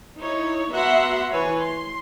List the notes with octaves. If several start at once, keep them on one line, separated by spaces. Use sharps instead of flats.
D#4 E4 C#5
B3 F#4 E5 F#5 A#5 C6
E3 B4 C#5 G#5
C6